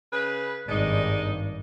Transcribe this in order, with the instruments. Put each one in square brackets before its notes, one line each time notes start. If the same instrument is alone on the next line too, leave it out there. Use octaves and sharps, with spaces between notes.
[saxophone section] C#3 B4
[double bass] G#1 G2 [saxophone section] G#3 D4 D#4